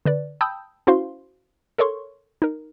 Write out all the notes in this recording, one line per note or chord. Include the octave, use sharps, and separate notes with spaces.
D3 B4 D5
G5 A5 B5 D#6 E6 G6
C#4 E4 F#4 C5 F5 C6
A4 A#4 C#5 C6 C#6
D#4 A#4